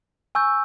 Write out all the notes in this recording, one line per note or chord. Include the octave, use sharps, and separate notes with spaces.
G#5 C#6 E6 G6